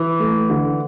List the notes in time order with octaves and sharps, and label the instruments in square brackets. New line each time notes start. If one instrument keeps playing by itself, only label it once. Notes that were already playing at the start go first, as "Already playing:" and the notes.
Already playing: [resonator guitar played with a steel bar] E3
[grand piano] A3
D3